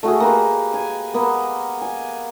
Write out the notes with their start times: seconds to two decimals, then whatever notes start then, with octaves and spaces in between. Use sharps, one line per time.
0.03 A3 F#4 G#4
0.20 A#3 G4 B4
0.74 G#5
1.14 A#3 B3
1.82 G#5